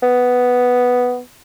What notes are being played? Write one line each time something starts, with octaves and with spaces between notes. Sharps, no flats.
B3